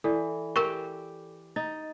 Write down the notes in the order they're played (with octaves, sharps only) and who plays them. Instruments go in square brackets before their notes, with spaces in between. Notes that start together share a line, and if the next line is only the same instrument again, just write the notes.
[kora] E3 [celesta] A4 D5
[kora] G4 [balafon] A#4 C#6
[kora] D#4 [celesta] A6